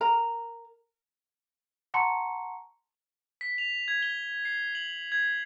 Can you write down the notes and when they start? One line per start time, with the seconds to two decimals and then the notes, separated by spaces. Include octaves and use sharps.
0.01 A#4 A#5
1.94 F#5 A5 A#5 C6 C#6 C#7
3.41 B6
3.58 F7
3.88 G#6
4.02 G7
4.45 C7
4.75 F#7
5.12 G#6